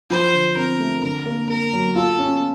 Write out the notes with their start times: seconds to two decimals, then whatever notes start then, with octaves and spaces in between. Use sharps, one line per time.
0.10 F3 C5
0.33 D3
0.56 C4 A#4
0.80 A3
1.03 D3 A#4
1.26 A#3
1.49 A#3 A#4
1.73 F#3
1.96 F4 A4
2.19 C#4